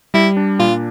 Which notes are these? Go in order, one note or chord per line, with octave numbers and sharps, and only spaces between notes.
G3 E4
D4
A#2 F4